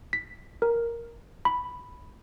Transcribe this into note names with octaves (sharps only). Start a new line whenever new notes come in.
B6
A#4
B5